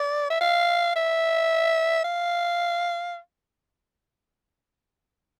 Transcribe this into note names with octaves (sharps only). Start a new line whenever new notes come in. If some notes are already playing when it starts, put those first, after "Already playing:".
Already playing: D5
E5
F5
E5
F5